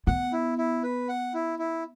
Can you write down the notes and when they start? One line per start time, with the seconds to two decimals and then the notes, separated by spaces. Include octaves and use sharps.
0.07 B3 F#5
0.33 E4
0.58 E4
0.83 B4
1.09 F#5
1.34 E4
1.59 E4